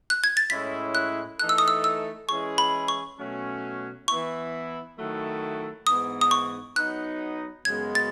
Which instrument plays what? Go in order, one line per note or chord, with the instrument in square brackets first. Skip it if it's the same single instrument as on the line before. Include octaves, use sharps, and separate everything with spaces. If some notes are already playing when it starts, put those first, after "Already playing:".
[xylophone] F#6
G#6
A6
[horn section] A2 G#3 C#4 E4 [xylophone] B6
[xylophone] F#6
[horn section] E3 A3 D#4 A4 [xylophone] F#6
[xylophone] E6
D#6
E6
E6
[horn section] E3 G#3 C#4 E4 G#4 [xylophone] C#6
[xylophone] B5
C#6
[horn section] B2 F#3 A3 C#4
[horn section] E3 B3 E4 [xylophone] C#6
[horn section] D#3 F#3 A3 E4 A4
[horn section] G#2 E3 B3 D#4 [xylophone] D#6
[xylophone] D#6
C#6
[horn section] F#3 B3 D#4 [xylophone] F#6
[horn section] F#2 C#3 G#3 B3 F#4 [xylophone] G#6
[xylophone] A6